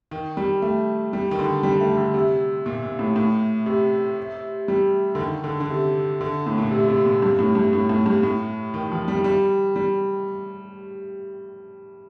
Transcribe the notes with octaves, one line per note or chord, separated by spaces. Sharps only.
D#3
G3
A3
G3
D#3
D3
G3
A3
D3
C3
A#2
A#2
A2
A2
C3
G3
D3
D#3
D3
D3
C3
D3
A2
A#2
C3
C3
A#2
G2
A2
G2
A2
A2
G2
A2
D#3
F3
G3
G3
G3